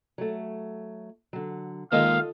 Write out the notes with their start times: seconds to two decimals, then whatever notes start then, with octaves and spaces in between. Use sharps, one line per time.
0.18 F#3 A3
1.33 D3 F#3
1.92 A#2 D#3 G#3 F4 A4 D#5 F5